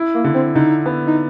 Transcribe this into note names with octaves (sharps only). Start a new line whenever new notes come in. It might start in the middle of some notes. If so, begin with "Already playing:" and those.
Already playing: E4
A#3
D3
C4
D3 D#4
B3
D#4